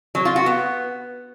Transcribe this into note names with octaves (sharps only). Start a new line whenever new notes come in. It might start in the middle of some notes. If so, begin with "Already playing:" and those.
F#3
F4
F#4
B3